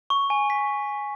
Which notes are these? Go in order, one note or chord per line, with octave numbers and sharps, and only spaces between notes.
C#6
G#5
B6